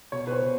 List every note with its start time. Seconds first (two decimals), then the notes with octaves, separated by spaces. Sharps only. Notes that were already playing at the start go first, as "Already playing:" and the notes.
0.12 B2 C#5
0.27 B4
0.32 C5
0.42 B2